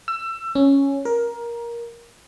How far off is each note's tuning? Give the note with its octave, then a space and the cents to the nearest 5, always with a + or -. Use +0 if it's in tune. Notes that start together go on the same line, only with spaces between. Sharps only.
E6 +25
C#4 +0
A#4 +15